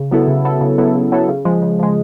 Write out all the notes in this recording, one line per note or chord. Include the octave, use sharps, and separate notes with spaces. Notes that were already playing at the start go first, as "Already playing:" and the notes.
Already playing: C#3
F#3 B3 E4 A4
C#3
F#3 B3 E4 A4
C#3
F#3 B3 E4 A4
C#3
F#3 B3 E4 A4
C#3
F3 G#3
C#3
F3 G#3